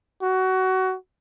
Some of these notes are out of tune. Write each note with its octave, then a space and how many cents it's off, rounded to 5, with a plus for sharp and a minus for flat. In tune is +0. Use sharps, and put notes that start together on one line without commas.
F#4 +20